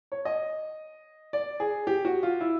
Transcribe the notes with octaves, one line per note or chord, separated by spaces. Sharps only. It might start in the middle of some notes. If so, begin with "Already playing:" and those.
C#5
D#5
D5
G#4
G4
F#4
F4
E4